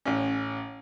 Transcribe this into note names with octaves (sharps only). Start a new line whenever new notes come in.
A1 C#4